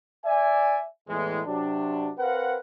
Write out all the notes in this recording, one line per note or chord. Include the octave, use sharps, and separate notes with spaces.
D5 E5 G#5
E2 A2 E3 G#3
C3 F#3 D4
C4 A#4 B4 F5 F#5